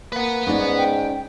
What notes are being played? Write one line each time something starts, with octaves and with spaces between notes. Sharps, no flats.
A#3 B4 F#5
G#2 C#4 D#4 D5
G5